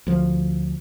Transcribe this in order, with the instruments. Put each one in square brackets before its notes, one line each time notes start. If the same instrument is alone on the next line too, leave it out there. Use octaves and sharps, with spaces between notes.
[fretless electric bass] D2 F3